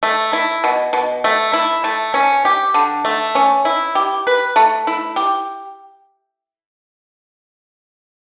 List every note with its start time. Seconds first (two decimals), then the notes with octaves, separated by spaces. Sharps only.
0.03 A3
0.33 E4
0.64 B2
0.93 B2
1.24 A3
1.53 E4
1.84 A3
2.14 C#4
2.45 G4
2.74 D3
3.05 A3
3.35 C#4
3.65 E4
3.95 G4
4.27 B4
4.56 A3
4.87 E4
5.16 G4